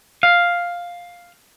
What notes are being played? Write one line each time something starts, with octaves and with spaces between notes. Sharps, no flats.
F5